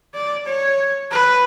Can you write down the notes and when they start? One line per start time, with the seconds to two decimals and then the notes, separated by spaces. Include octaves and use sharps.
0.14 D5
0.46 C#5
1.11 B4